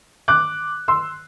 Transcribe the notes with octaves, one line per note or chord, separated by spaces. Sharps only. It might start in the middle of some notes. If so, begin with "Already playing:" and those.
D6 F#6
C6 E6